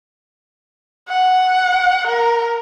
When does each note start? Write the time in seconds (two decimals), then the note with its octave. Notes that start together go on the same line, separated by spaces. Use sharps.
1.09 F#5
2.07 A#4